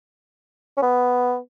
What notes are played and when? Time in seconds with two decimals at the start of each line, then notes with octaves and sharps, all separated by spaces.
0.77 C#4
0.82 B3